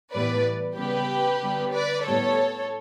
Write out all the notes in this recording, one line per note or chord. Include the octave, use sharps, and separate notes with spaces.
A2 E3 G3 B3 B4 D5
C#3 G3 B3 G4 B4
D3 G3 B3
B4 D5
A2 G3 B3 A4 C#5